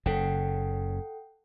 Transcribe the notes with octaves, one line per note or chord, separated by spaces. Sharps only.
F#1 C#3 A4 F#5 G5